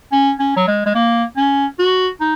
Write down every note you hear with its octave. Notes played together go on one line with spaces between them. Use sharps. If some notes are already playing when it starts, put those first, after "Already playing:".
C#4
C#4
F#3
G#3
G#3
A#3
C#4
F#4
D#4